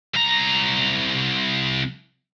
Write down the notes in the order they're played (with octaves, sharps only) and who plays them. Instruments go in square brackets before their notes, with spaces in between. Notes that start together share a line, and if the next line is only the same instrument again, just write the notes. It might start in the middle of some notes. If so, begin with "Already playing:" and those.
[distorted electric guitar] C2 A#5